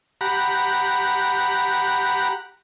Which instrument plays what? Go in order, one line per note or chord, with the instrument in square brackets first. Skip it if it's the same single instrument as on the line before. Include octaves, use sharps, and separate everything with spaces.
[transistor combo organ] G4 F#5 A#5 B5